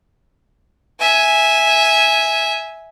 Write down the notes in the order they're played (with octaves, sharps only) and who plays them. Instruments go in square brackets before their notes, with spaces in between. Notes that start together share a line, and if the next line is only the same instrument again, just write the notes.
[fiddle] E5 G#5